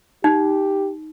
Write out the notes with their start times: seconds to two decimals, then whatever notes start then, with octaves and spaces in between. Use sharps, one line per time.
0.24 D#4 G4